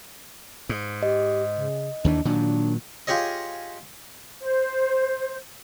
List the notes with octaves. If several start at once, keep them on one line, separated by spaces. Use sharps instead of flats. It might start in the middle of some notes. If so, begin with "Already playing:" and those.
G#2
G4 D#5
C#3
D#2 D#3 E3 D4
A#2 D#3 F#3 D4
F4 G4 G#4 C#5 D#5
C5